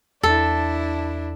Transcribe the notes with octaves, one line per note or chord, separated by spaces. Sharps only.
E2 D4 E4 A4